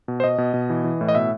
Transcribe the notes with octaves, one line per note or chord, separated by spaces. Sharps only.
B2
C5
B2 D#5
B2
B2
E3
E3
A2
D#5
B2 E5